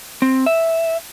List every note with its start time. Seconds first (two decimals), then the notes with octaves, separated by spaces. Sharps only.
0.22 C4
0.46 E5